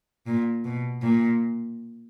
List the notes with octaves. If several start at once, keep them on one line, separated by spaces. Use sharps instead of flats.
A#2
B2
A#2